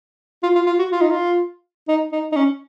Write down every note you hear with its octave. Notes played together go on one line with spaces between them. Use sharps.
F4
F4
F4
F#4
F4
D#4
F4
D#4
D#4
D#4
C#4